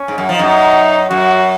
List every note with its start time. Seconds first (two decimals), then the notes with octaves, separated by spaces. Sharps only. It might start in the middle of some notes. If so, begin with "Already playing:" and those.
Already playing: C#4
0.08 G#2
0.18 F#2
0.29 F3 D#4
0.39 F#2
1.10 F#2 F#4